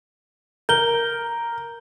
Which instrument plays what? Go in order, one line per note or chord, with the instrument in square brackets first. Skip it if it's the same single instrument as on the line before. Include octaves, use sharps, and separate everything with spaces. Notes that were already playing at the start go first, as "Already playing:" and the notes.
[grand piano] A#4 [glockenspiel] G6 G7